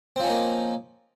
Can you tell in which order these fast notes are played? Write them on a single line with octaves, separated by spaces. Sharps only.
C4 F3 C#4 D#4 A#3